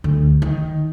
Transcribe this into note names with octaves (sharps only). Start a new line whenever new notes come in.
D2
D#3